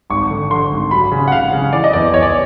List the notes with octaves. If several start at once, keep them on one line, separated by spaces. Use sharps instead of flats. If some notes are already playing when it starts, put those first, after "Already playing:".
G#1 C#6
D3
D3 C6
G#1
F#3 B5
C#3
F#5
C#3 F5
C#3
E3 D5
D#5
E2 D5
E2 C#5
D5